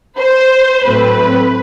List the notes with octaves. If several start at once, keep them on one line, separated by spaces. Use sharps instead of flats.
C5
A2 F#3 A3 C4 B4